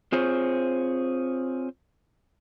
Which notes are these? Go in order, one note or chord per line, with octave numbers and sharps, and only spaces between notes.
C4 F4 G#4 C5 C#5